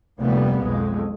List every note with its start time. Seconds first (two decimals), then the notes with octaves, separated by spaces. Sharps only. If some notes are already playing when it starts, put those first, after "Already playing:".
0.19 F1 D2 G3 A#3 B3
0.63 B1 F2 G#3